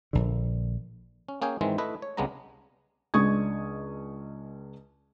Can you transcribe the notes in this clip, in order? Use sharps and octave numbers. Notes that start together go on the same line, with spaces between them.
A#1 D3
C#4
A#3 C#4 G#4 G5 G#5
G#2 D#3 E3 G#3 C4
A3 E4 B4 D#5
C#5
C2 C#3 G#3 B3 D4 A#5
C#2 G#3 D4 C#6 D#6 G#6